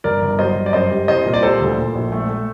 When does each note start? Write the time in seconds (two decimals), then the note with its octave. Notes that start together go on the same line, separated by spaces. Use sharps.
0.04 G1 A#4 D5
0.22 G1
0.39 F#3 C5 D#5
0.56 G2
0.66 D5
0.73 F#2 C5 D#5
0.91 G3
1.08 C2 C5 D#5
1.26 A#2
1.34 D5
1.43 G3 A4 C5
1.60 D2
1.78 A#2
1.95 A#1
2.12 A3
2.29 A3